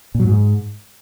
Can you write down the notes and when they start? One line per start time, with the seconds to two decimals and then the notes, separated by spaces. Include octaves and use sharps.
0.15 A#2
0.20 F#3
0.25 G#2